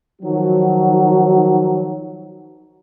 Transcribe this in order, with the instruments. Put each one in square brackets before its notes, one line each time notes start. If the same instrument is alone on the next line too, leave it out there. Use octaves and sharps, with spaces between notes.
[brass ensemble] D#3 F3 F#3